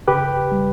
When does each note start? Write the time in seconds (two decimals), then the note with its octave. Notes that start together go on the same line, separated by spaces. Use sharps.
0.08 C#3 G4 B4
0.52 G3